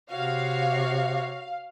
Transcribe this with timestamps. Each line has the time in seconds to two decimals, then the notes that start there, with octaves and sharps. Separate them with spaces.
0.11 C3 F#4 C#5 F5